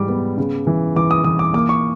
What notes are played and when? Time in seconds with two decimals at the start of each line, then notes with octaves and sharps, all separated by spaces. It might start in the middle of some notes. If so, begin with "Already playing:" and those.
Already playing: G#2 E3 G3 D6
0.09 B3
0.38 C#3
0.67 E3
0.96 E3 D6
1.11 D#6
1.24 E3 D#6
1.39 D6
1.54 A#3 D6
1.69 C#6